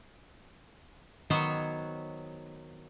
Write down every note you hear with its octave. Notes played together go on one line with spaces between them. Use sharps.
D#3 F#3 B3 C5 C#5